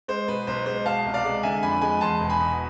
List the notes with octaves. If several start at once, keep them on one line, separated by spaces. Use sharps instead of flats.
G#3 C5
B2 B4
B1 C5
G#3 C5
B2 F5 A5
C2
D5 F5
G#3
D3 E5 G#5
F2 G#5 B5
G#3 G#5 B5
E2 A5 C6
E1
G#5 B5
B2